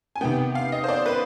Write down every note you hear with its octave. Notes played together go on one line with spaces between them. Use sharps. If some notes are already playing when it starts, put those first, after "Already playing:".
G#5
C3 D#3 B3 G5
F5
D#5
C5
D5
B4